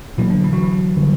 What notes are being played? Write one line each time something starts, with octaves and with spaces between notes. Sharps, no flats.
B2 E3 F#3 A#3
D3
E3
F#3
E3
D3 G3